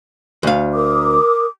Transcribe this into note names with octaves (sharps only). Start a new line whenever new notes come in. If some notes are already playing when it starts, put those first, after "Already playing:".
D2 F5
A#4 D6 D#6